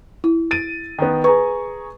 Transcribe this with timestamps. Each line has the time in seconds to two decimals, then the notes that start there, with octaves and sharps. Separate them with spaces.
0.24 E4
0.51 A6 D7 D#7
0.99 D#3 B3
1.24 G#4 B4 A#5 C#6